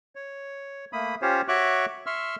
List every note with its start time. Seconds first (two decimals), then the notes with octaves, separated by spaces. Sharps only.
0.15 C#5
0.93 A3 A#3 B5 D#6
1.22 C#4 F4 G4 C5 C#5
1.48 F#4 C#5 E5 C#6 D6 F#6
2.06 E5 C6 C#6 E6 F6